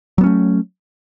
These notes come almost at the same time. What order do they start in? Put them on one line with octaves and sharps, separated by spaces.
F#3 B3 C#4 A3